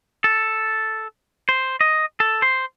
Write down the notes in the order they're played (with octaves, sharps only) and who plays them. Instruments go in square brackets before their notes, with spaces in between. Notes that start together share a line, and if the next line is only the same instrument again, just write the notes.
[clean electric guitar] A4
C5
D#5
A4
C5